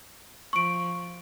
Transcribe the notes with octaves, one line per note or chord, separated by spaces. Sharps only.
F3 C#6 D7